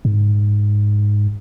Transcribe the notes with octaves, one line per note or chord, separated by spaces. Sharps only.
G#2